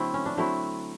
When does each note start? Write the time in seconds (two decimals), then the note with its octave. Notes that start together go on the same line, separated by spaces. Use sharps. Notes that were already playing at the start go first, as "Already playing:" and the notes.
Already playing: D3 F#3 A3 C4 E4
0.14 C#4
0.26 D4
0.37 D3 F#3 A3 C4 E4